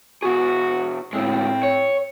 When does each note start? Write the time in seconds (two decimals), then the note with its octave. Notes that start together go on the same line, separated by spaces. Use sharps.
0.22 B2 F#4 G#4
1.13 D2 A2 G#3 C4
1.63 C#5